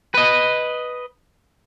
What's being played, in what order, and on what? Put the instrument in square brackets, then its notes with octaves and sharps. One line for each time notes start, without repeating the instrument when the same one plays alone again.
[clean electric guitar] B4 D#5